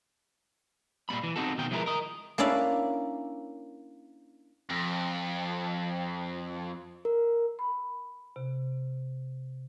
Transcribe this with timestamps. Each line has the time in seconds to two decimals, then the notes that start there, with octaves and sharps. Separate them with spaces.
1.09 A#2 G3 A3 B5
1.23 E3
1.36 C4 D#4 F#4 A4
1.58 B2 D#3 G5
1.71 F3 G#3 E4 G4 A#4 B4
1.86 A#4 D#5
2.38 A#3 C#4 D4 E4 D5 F5
4.69 F2
7.05 A#4
7.59 B5
8.36 C3